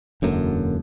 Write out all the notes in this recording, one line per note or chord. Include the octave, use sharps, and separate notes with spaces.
E1 F#2 D3 A#3